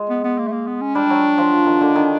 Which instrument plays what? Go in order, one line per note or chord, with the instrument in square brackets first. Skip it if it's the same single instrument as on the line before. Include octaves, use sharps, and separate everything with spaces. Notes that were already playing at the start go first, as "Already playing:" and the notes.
Already playing: [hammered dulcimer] G#3
[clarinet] B3
B3
A#3
A3
A#3
B3
C#4
[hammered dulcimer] G3 [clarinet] D4
[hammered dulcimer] F#3
F3
D#3
D3
D#3